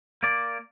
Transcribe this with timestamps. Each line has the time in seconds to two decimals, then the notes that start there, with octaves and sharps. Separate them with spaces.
0.23 A#3 D5